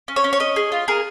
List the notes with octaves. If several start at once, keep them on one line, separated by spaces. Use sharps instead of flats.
C#4
C#5
C#4
C#5
C#4 D#5
G#4
F4
G#4 A#4